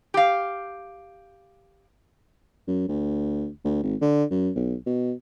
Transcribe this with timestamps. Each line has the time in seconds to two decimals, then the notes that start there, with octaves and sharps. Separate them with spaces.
0.14 G4 F5
2.68 F#2
2.88 D2
3.65 D2
3.83 G#1
4.01 D3
4.31 F#2
4.56 B1
4.86 B2